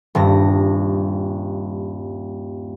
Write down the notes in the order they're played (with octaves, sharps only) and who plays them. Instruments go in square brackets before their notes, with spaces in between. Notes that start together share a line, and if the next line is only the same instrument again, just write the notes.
[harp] D#1 G2 A#6